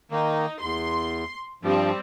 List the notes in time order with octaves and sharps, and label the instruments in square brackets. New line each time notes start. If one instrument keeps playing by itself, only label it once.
[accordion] D#3 A#3 [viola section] D#4
[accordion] E2 [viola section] C6
[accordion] G2 F3 [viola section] G3 C4